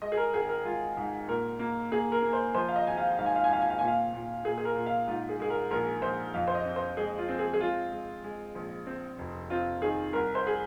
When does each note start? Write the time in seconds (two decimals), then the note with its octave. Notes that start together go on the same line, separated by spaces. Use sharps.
0.02 G#3 D#5
0.12 G#4
0.17 A#4
0.34 G#1 G#4
0.49 A#4
0.64 G#3 F4
0.97 G#2
1.28 A#2 A#4
1.59 A#3
1.92 A#3 G#4
2.12 A#4
2.22 A#3
2.33 C5
2.55 F3 C5
2.68 F5
2.76 D#5
2.87 G#1 G#5
2.97 F5
3.18 G#2 F5
3.26 G#5
3.35 F5
3.44 G#5
3.49 G#1 F5
3.62 G#5
3.70 F5
3.79 A#2 G#5
3.88 F5
4.13 A#2
4.44 A#2 G#4
4.58 G#4
4.65 A#4
4.75 A#2
4.86 F5
5.07 G#2 F4
5.29 G#4
5.40 G#3 G#4
5.50 A#4
5.71 A#1 A#4
6.02 A#1 C5
6.34 F2 F5
6.47 C5
6.55 D#5
6.65 C4
6.76 C5
6.97 G#3 G#4
7.18 F4
7.29 C4
7.39 G#4
7.54 G#4
7.61 G#3 F4
7.92 G#3
8.24 G#3
8.55 A#1
8.87 C4
9.18 F1
9.50 C4 F4
9.82 D#3 G#4
10.13 C2 A#4
10.35 C5
10.47 G#4